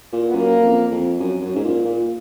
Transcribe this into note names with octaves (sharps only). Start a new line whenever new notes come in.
A#2
B3
F#2 A#3
F2
F2
F#2
F#2
G#2
A#2
A#2